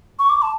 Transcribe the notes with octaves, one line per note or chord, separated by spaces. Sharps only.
C#6
D6
A5